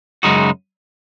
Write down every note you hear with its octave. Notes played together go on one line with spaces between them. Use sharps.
F#2 C#3 G#3 D#4 F#4